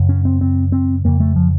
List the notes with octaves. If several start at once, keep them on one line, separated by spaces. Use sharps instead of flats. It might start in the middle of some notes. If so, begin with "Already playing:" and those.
Already playing: F#2 C#3
C#4
C4
C4
C4
F2 C#3 A#3
A3
F3